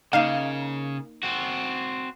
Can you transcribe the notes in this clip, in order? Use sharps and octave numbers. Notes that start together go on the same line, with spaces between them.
C#3 A#3 D#4 F5
C4 F#4